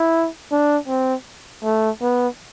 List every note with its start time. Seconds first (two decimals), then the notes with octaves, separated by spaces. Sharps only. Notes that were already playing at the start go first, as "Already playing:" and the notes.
Already playing: E4
0.51 D4
0.88 C4
1.64 A3
2.01 B3